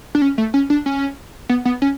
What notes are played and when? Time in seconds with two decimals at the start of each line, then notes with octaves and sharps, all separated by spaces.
0.15 D4
0.22 C#4
0.38 A3
0.54 C#4
0.70 D4
0.86 C#4
1.49 B3
1.65 B3
1.82 C#4